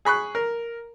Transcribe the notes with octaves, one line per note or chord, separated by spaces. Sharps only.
G#4 B5 C#6 F#6
A#4